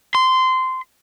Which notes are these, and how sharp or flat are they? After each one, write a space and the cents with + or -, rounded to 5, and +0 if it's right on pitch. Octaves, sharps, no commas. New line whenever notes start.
C6 -15